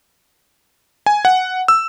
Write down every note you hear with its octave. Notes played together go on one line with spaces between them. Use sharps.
G#5
F#5
E6